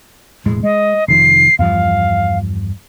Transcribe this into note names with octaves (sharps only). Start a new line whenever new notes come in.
E1 A2 G#3
G#3 D#5
F1 D#3 F3 C7
E2 G2 F3 F5